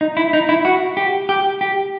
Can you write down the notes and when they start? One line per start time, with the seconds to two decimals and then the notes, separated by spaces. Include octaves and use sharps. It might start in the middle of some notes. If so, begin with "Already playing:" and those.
0.01 D#4
0.17 E4
0.33 D#4
0.49 E4
0.65 F#4
0.97 G4
1.29 G4
1.61 G4